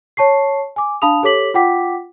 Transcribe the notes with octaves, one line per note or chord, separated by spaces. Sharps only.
C#5 A5 C#6 C7
G#5 D6
D4 F5 A5 B5 D#6 F7
G4 A4 C#5 D6 B6 F#7
F4 F#5 G5 D6 B6